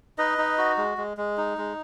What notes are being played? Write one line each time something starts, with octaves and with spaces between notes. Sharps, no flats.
D#4 B4 D#5
D#4
F#4
G#3
G#3
G#3
D#4
G#3